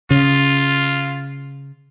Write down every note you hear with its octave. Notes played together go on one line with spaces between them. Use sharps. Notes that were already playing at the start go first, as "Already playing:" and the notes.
C#3 F4